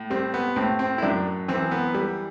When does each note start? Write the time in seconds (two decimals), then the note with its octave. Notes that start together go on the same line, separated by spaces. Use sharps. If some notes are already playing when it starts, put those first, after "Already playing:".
Already playing: A2
0.10 G3 C4
0.34 B3
0.56 A2 C4
0.79 C4
0.98 E4
1.02 F#2 D4
1.48 E3 C4
1.71 B3
1.94 G3